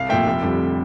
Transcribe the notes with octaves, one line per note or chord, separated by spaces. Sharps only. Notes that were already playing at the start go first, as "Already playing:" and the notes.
Already playing: C2 F5
A#2 F3 A3 E5 G5
F1
F2 D3 G3